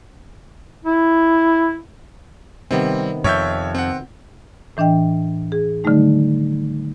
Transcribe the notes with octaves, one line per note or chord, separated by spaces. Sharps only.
E4
C3 D#3 G3 B3 C4
F2 C#5 E5 G6
C4 F#5
A2 E3 D4 D#5 G5
G#4
D3 D#3 F#3 G3 A3 D#4